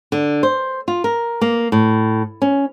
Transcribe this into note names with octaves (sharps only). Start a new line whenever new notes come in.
D3
C5
F4
A#4
A#3
A2
C#4